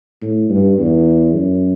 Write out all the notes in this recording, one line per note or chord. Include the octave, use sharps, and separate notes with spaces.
A2
G2
E2
F#2